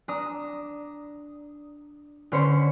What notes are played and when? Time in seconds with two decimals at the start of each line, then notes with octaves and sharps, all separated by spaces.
0.08 D4 A#5 D#6
2.32 D3 C#4 C5 B5 C#7